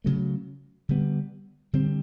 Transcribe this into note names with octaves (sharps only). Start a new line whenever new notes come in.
C#3 F#3 A3
D3 G3 B3
D3 G3 C4